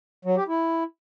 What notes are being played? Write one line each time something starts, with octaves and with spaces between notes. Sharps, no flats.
F#3
G4
E4